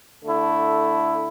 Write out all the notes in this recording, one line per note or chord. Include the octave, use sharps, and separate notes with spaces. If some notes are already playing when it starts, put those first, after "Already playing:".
D3 A3 E4